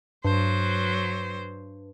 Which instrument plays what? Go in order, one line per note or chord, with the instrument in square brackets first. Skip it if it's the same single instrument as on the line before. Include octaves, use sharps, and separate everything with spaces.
[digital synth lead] G2 [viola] F#3 C5